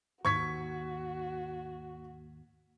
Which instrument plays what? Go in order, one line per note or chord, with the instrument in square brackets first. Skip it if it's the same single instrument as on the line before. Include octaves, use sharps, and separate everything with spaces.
[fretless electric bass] D#2 [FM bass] G#2 [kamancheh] F#4 [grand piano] C#6 G#6 B6